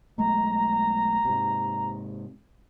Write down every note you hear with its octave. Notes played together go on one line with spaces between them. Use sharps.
B1 G#3 A3 A#5
G#2 C3